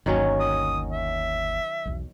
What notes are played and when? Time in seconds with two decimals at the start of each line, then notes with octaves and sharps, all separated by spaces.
0.06 G1 D#2 D#3 F#3 C#4
0.40 D#6
0.92 E5
1.86 B1 E2